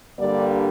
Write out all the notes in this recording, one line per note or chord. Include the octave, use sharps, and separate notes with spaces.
G2 D3 G3 A#3 D5